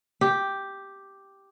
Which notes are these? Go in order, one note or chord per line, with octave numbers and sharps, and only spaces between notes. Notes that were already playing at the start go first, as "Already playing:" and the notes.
G4